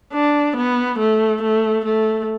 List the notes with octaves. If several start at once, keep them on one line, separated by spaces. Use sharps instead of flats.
D4
B3
A3
A3
A3